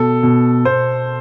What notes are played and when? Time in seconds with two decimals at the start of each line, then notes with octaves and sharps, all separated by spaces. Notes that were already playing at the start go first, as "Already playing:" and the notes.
Already playing: B2 A4
0.23 B2
0.65 B2 C5